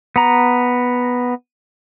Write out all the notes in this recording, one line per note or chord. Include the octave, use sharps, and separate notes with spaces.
B3 A#5